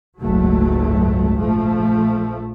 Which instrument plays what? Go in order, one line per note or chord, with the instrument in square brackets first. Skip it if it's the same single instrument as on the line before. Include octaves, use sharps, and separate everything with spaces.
[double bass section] F#1 C#2 G#2 F#3 A3
A#1 F3 A3